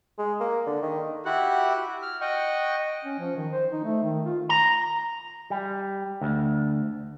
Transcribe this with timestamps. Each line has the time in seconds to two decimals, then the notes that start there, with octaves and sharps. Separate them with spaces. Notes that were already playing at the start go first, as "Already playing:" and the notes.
0.19 G#3
0.40 A#3
0.67 D3
0.82 D#3
1.25 E4 F#4 G4 F#5 F#6
2.02 F6
2.21 D#5 F#5 G5 C#6
3.05 C#4
3.19 F3
3.36 D#3
3.52 C5
3.72 D#4
3.84 A3
4.03 D#3
4.26 F4
4.49 A#5
5.50 G3
6.21 D2